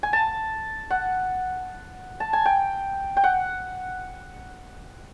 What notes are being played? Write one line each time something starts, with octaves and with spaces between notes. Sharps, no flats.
G#5
A5
F#5
A5
G#5
G5
G5
F#5